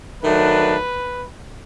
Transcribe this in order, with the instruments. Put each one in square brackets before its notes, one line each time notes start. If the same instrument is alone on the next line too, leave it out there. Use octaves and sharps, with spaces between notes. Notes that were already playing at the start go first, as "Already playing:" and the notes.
[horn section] D#3 F#3 A3 D4 B4